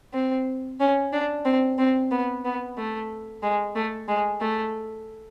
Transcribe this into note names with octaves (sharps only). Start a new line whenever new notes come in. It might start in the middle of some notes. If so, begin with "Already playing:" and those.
C4
C#4
D4
C4
C4
B3
B3
A3
G#3
A3
G#3
A3